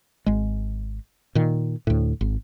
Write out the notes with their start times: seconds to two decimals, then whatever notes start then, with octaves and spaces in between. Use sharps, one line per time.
0.26 G#1 G#3
1.35 A#2 D#3
1.87 D2 A2
2.21 G#1